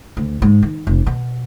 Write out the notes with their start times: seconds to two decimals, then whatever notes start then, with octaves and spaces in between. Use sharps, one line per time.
0.17 D2
0.42 G#2
0.62 D#3
0.87 F1
1.06 B2